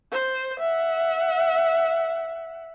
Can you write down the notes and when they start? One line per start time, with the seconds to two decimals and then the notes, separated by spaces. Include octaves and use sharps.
0.12 C5
0.60 E5 F#5